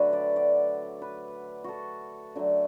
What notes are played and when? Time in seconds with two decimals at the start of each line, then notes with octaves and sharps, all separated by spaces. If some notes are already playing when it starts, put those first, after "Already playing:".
Already playing: D3 F#3 A3 F#4 B4
0.13 D5
0.36 D5
1.02 B4
1.64 F#4 A4
2.35 D3 F#3 A3